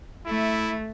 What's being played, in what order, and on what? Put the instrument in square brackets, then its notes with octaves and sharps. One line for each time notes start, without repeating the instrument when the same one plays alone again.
[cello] A3 [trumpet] E4